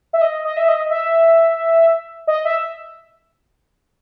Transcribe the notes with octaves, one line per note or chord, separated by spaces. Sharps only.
E5
D#5
D#5
E5
D#5
E5
D#5
E5